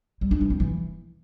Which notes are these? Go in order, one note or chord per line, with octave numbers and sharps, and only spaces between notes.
G3
D4
E3
C4
E3